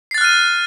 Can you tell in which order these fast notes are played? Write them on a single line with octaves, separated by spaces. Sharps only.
C7 A6 F#6 F6 D#7